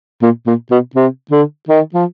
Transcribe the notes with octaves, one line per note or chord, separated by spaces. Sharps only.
A#2
A#2
B2
C3
D3
D#3
F3